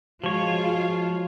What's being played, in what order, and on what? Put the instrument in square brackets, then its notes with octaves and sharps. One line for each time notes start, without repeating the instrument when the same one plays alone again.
[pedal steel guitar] F3 C#5 [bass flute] G#3 [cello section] F4 [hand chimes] F#4